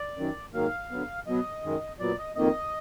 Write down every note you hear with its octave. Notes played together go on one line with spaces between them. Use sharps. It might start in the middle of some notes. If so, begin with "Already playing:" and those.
Already playing: D5
F#2 D#3 F#3
G#2 D#3 F#3 A#3 F5
D3 F#3 B3
B2 F#3 B3 D#5
F#2 D#3 G#3
A#2 F#3 B3 D5
D#5
F2 D#3 A#3 D#5